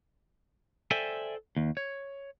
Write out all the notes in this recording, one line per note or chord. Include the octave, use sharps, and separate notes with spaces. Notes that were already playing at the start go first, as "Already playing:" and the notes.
A4 C5 D5 E5 G5 G#5
D#2
C#5